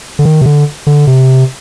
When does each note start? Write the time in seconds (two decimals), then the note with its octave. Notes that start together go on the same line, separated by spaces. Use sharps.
0.19 D3
0.25 D#3
0.41 C3
0.46 D3
0.87 D3
1.07 C3